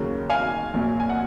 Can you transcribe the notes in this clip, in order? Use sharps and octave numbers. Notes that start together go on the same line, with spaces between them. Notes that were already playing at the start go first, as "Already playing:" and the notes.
Already playing: D#2 C#3 F#3 A#3
F5 G#5
A#1 A#2 F#3
G#5
F#5